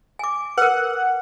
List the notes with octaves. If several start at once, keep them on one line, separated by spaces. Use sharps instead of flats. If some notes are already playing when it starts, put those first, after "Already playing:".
G#5 D6
A#4 B4 F#5